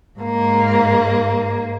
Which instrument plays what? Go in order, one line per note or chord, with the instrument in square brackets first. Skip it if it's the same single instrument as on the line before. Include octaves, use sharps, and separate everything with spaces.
[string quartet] G#2 A#3